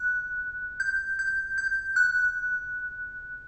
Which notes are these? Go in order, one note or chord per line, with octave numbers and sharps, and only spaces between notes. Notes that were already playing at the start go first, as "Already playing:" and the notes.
Already playing: F#6
G6
G6
G6
F#6